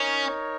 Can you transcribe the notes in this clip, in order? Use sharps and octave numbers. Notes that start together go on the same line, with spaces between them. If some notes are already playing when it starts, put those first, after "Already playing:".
Already playing: C#4 D#4 A#4 C#5